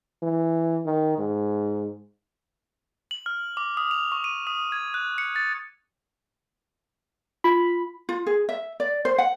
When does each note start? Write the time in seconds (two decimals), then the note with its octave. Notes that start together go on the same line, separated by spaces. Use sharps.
0.23 E3
0.86 D#3
1.18 G#2
3.11 F#7
3.26 F6
3.57 D6
3.77 D#6
3.91 F7
4.12 C#6
4.24 D#7
4.47 D#6
4.72 G#6
4.94 F#6
5.18 C#7
5.36 A6
7.44 F4 B5
8.09 F4
8.26 G#4
8.49 E5
8.80 D5
9.05 C5
9.18 F#5